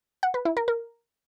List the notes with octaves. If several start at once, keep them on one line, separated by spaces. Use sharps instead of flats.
F#5
B4
E4
A#4
A#4